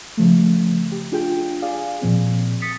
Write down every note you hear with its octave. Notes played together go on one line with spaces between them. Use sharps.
C#3 F3 A3
G4
D4 F4 G#4 G5
G#4 D5 F5 G#5
A#2 F3 C4
D#6 A6 B6 C#7